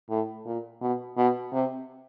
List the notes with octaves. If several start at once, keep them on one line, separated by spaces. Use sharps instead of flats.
A2
A#2
B2
B2
C3